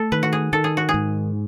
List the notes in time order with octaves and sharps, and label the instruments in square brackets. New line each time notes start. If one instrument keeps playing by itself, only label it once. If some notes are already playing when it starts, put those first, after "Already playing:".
Already playing: [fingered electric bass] A3 [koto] A4
[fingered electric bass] D#3 [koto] B4
[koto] F#4
G#4
[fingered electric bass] D#3 [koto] A4
[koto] G#4
F#4
G#4
[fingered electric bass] G#2